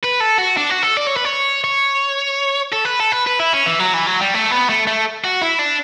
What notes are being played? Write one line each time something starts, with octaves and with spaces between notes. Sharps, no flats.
B4
A4
F#4
D4
F#4
A4
D5
C#5
B4
C#5
C#5
A4
B4
A4
B4
B4
E4
C#4
E3
F#3
E3
F#3
G3
A3
B3
A3
A3
F#4
E4
D4